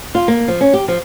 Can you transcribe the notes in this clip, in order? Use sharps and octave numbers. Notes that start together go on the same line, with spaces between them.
F4
A#3
F3
C#4
G4
F3